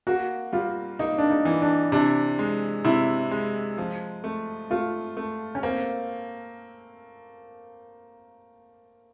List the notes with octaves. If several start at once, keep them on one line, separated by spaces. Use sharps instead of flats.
A#3 F#4
G3 F4
A#3 D#4
D4
D#4
E3
D4
C3 D4
G#3
C3 E4
G#3
F3
A3
A3 F4
A3
C#4
A#3 C4